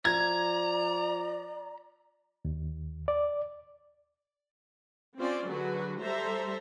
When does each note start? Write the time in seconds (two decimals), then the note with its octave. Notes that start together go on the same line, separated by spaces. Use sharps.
0.05 F3 D5 A#5 G#6
2.45 D#2
3.08 D5
5.17 C4 C#4 F4 C5 D5
5.47 D3 F#3 F#4 G#4 B4
6.00 G3 A4 C5 E5 A#5